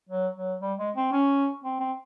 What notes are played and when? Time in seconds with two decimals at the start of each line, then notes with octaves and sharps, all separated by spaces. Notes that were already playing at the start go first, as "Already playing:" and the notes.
0.09 F#3
0.36 F#3
0.61 G3
0.79 G#3
0.95 C4
1.12 C#4
1.64 C4
1.80 C4